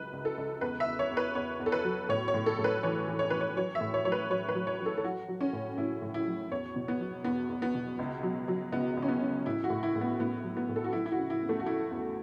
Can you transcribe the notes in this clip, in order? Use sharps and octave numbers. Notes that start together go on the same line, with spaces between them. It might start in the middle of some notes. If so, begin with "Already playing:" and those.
Already playing: C#2 F#3 B4
C#2
A4
C#2
E2 B4
E5
E2
C#5
E2
B4
E2 C#5
E2
A4
B4
F#3
A2 C#5
C#5
A2
A4
A2
B4
E3 C#5
E3
C#5
E3 B4
C#5
F#3 C#5
E5
A2
C#5
F#3 C#5
B4
F#3 C#5
B4
F#3
C#5
F#3
A4
A4
F#3 F#4
F#3
C#4
A2
A2 E4
A2
E4
F#3
E2 C#5
B2
B3
F#3
E2 B3
E2
B3
B2
C#2
F#3
F#3
C#2 B3
C#2
C#4
B3
C#3
A2 E4
F#4
A2
E4
A2
B3
A2 B3
F#3
B3
A2
A4
F#4
F#3 E4
E4
F#4
C#3
E4
E2
A3
F#4
C#3 E4
E2